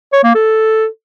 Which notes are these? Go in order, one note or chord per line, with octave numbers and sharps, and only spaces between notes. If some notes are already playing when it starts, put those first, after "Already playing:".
C#5
A#3
A4